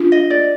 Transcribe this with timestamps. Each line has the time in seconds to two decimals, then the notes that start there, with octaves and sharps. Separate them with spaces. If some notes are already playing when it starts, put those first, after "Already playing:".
Already playing: D4 F4
0.12 D#5
0.30 D5